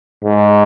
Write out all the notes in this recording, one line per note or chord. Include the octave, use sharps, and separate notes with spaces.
G#2